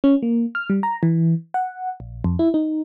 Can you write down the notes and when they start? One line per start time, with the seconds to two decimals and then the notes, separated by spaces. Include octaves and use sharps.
0.04 C#4
0.23 A#3
0.55 F6
0.70 G3
0.83 A#5
1.03 E3
1.54 F#5
2.00 A#1
2.24 F2
2.39 E4
2.54 D#4